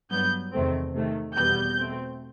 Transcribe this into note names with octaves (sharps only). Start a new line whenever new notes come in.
G2 F#3 B3 G6
E2 C3 D#3 A3 C4
C3 D#3 A3
E2 B2 G3 B3 G6
B2 A3 C4